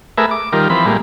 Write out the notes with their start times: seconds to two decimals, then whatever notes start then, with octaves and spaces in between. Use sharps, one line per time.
0.18 A3 G#4 A#4 B4 E5
0.31 D6
0.53 D#3 G3 F4 A#4
0.70 E3 F3 C4 B5
0.86 A2 G3 G#3 A#3